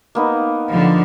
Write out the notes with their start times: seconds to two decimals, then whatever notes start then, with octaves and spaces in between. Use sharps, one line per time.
0.15 A#3 B3 D#4
0.69 D3 F3